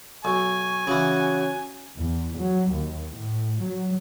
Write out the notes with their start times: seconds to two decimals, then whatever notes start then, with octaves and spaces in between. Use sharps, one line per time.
0.25 B1 G#5 C#6
0.87 C#3 E3 C#4 F#4
1.96 E2
2.39 F#3
2.71 D#2
3.15 A2
3.62 F#3